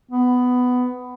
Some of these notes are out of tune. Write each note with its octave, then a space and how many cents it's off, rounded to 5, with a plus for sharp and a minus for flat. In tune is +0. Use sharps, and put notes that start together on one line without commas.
B3 +10